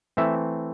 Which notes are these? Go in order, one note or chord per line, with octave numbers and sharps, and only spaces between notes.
E3 A3 C4 E5